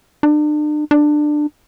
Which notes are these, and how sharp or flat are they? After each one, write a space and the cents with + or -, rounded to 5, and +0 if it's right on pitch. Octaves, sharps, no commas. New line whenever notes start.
D4 +40
D4 +20